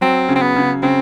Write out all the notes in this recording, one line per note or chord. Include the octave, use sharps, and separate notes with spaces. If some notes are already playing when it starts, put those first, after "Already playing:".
F#3 C4
C#3
C4
B3
C#3
C#3 C4